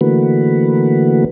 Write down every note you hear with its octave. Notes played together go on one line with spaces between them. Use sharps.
D3 E3 A3 A#3 F#4 B4